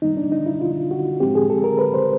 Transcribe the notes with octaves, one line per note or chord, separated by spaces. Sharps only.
F#2 D#3 G3 A#3 D#4
D4
D#4
E4
F4
F#4
A2 F3 G#3 C4 G4
G#4
A4
A#4
B4
C5